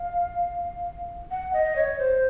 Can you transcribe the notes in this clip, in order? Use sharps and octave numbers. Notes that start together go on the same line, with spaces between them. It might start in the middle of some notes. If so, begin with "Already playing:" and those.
Already playing: F5
F#5
D#5
C#5
C5